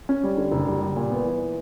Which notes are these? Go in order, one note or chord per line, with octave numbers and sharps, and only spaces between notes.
C#4
G3
D3
F#1
G3
G3
A#2
B3
E3